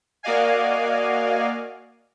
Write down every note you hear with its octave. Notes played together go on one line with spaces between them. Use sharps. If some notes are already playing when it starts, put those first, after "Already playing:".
A#3 F#4 D5 D#5 F5 G#5